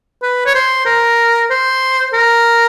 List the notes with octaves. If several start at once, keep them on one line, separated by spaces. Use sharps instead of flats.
B4
C#5
C5
A#4
C5
A#4